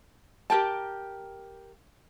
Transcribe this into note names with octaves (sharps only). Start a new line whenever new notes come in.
G4 A#4 G5 A5